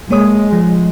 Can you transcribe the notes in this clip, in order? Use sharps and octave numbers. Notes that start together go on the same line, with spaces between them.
G#3 A#3 C#5 D#6
F3